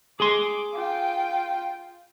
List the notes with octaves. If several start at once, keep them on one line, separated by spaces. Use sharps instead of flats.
G#4 C6 D6
F4 G5